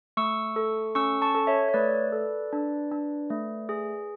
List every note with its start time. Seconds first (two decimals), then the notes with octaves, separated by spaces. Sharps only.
0.17 A3 C#6 E6
0.56 A4
0.95 C#4 C#6 E6
1.22 A5 C#6
1.35 A4
1.47 C#5 E5
1.69 C#5
1.74 A3 B4 D5
2.12 A4
2.53 D4
2.92 D4
3.30 A3
3.69 G#4